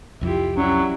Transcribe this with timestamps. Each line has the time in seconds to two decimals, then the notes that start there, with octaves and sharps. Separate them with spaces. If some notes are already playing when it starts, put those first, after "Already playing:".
0.21 C2 F2 E4 F4 G4
0.57 F#3 C#4 D4 E4 G4